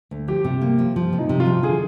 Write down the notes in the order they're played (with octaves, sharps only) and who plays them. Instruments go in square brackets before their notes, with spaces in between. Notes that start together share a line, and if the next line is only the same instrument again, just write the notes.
[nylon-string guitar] D2
[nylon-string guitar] F3 [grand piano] G4
[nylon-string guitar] C3
A#3
F3
F3
C3
[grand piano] D#4
[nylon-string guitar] C3
[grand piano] F4
[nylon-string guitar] F3
[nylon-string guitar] D3 [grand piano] G#4